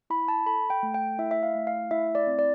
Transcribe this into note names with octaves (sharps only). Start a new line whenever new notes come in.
E4 B5
A5
A4 B5
G5
A3
G5
E4 E5
E5
F5
A3
F5
E4 E5
D5
C4
D5